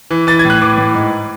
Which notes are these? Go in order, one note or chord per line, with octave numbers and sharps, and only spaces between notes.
E3
E3 A6
G#6
A2
F#6
E3 D6
A2
G#2